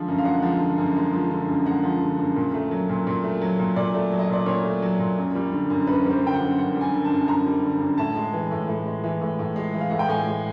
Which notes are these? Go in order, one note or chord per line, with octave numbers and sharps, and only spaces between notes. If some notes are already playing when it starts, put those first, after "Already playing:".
Already playing: D3 F3 G#3
F#2
F5
G#3 F#5
F3
D3
F#2
G#3
F3
D3
F#2
G#3 F#5
F3
D3
F#2
A#2
A3
F#3
A#2
A#2
A3
F#3
A#2
A#2 D5
A3
F#3
D#5
A#2 D5
A#2 C#5
A3
F#3
A#2
F#2
G3
D3
F#2
F#2 B4
G3 B4
C5
D3 G5
F#5
F#2
F#2 F#5
G3
G#5
D3
A5
F#2
F#2 A#5
G3
D3
F#2
A2 A5
G#3
E3
A2
A2
G#3
E3
A2
A2
G#3
E3
F5
A2 F#5
G5
A2 G#5
G#3